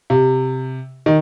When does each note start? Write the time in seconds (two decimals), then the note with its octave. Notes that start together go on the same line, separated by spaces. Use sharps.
0.10 C3
1.06 D#3